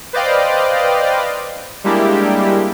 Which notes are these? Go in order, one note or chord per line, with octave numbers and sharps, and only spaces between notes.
B4 C5 D5 D#5 F5 G5
G3 G#3 A#3 D4 E4 G4